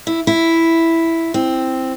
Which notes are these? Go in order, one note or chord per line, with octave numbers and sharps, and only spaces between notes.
E4
E4
C4